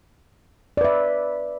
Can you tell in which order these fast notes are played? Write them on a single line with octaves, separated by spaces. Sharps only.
D5 B4 E5